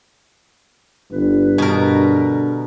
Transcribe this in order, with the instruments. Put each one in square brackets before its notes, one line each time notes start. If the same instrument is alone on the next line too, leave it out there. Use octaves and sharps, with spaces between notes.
[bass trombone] G1 [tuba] G2 [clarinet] B4
[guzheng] B2 A#4 [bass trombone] D3